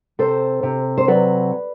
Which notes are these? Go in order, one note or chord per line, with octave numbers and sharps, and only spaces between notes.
C3 A4 C5
C3
C5
F#3 B4 D5